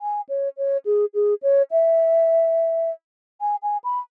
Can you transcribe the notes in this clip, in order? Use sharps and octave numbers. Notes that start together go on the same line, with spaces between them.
G#5
C#5
C#5
G#4
G#4
C#5
E5
G#5
G#5
B5